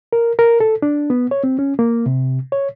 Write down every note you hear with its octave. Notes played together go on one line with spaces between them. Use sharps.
A#4
A#4
A4
D4
B3
C#5
C4
C#4
A#3
C3
C#5